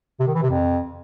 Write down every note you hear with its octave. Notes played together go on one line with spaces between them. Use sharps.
C3
D#3
E3
C3
F2